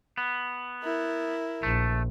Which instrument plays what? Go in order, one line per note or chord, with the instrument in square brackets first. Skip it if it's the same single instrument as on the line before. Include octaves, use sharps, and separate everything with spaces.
[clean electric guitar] B3
[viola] E4 A#4
[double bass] A#1 [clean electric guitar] A3